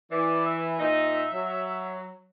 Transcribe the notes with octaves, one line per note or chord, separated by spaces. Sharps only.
E3 D5
E5
A#2 D#4
F#3